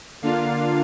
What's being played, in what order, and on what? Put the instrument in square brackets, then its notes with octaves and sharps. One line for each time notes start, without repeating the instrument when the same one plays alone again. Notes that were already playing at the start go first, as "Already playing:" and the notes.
[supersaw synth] D3 A#3 D4 F4 F5